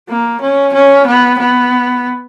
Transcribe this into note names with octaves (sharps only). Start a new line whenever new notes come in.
A#3
C#4
C#4
B3
B3